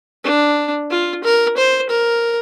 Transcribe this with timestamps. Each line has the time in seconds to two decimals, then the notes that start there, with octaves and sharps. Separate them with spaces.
0.24 D4
0.90 F4
1.24 A#4
1.57 C5
1.89 A#4